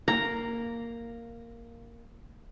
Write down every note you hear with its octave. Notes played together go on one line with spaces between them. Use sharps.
A#3 A#5